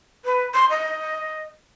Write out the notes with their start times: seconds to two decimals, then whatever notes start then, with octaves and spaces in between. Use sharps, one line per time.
0.25 B4
0.54 C6
0.70 D#5